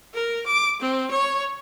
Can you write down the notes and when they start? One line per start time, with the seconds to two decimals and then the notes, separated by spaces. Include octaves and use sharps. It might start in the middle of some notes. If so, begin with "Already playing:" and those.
0.13 A#4
0.46 D6
0.81 C4
1.11 C#5